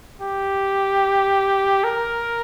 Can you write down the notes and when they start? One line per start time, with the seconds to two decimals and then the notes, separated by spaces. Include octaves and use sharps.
0.21 G4
1.84 A#4